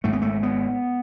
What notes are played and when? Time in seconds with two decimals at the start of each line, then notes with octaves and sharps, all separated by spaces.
0.04 G#1 G#2 A3
0.13 B3
0.22 A3
0.43 B3